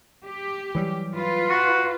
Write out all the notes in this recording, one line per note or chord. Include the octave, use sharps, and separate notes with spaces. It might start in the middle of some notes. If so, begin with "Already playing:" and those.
G4
E3 F#3 G3
F4 B4
F#4